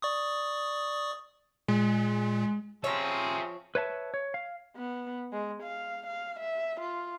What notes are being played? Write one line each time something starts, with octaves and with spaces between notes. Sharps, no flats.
D5 C#6 D#6
A#2 G#3
F3 C4 F4 G#4 C#5 E5 A#5
B4 C#5 E5 A5
C#5
F5
B3
G#3
F5
F5
E5
F4